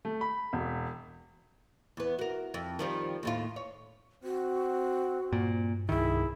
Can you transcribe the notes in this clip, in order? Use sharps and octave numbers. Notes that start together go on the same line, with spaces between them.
A3
B5
E1
E2 B3
F#4 A#4
F2
D#3 F3 G3
D#2 A2 F4
C#5
C4 F#4
G2 A#2
C2 D#3 E4 G#4